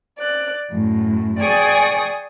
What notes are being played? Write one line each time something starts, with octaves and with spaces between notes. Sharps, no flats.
D5 F#6
F#2 A2
G#4 D5 G5 G#5 C#6 D#6